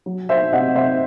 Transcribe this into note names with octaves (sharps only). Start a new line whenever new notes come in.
F#3
C5 E5
C3 D#5 F#5
C5 E5